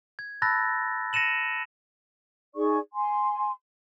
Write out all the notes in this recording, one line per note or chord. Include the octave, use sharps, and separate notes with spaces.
G#6
A5 B5 E6 F#6 A6 A#6
A#6 C#7 D#7 E7 F#7
D#4 G#4 D5 C#6
G#5 C6